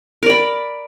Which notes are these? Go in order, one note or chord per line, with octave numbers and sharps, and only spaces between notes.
A#4 D5 B5